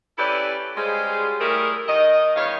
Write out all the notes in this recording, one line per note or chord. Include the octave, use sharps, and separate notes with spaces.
C#4 E4 G4 A4 B4 D5
G3 G#3 C#4 F4 G#4 C5
G3 A3 E4 G#4 A#4
D#3 D#5
E2 G2 D#3 C#5 F5